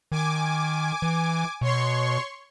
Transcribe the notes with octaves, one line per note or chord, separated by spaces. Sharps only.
D#3 G#5 D6
E3
B2 C#5 C6 C#6